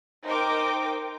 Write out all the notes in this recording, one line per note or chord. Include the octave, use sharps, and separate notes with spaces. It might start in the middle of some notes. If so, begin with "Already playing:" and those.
D#4 A#4 C5 G5 D6